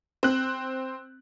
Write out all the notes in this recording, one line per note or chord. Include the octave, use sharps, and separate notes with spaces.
C4 F#6